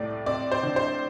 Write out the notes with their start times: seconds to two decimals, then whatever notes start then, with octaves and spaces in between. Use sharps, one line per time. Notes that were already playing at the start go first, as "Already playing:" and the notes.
Already playing: C2 A2 A3 D5
0.26 C4 D5
0.52 C5
0.63 D3
0.76 C5